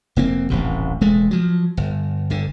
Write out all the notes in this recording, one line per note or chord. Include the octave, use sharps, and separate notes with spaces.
F1 A#3 C4
D#1 A1 C3
E1 G#3 A3
F3 F#3
G1
G1 D3